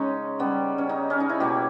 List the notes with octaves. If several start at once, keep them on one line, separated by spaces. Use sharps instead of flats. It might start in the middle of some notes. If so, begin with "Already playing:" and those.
Already playing: C#3 G#3 C#4 D#4
C#3 G3 B3
C#4
D#4
C#4
D#4
E4
B2 A#3 C#4 G4